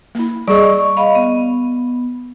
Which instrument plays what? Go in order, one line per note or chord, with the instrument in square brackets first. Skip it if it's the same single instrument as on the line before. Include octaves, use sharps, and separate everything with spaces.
[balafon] A#3 E4
[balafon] G3 G#4 D#5 [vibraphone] D5 C#6
[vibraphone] C#6
[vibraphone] D#5 F5 [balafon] B5
[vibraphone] B3